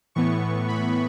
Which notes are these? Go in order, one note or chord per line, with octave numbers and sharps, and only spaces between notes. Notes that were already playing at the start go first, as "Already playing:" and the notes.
A2 E3 B3 C#6
B5